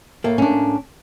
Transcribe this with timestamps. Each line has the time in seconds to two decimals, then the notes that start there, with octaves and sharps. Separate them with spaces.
0.24 A2 A3 A#3
0.38 C#4 D4